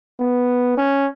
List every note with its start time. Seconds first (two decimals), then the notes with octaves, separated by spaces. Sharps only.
0.20 B3
0.78 C#4